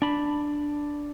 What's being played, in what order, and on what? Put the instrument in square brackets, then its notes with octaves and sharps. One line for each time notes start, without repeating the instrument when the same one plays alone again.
[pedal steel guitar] D4 B5